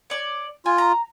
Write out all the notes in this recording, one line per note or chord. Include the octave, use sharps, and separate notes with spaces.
C#5 D5
F4 G#5
A#5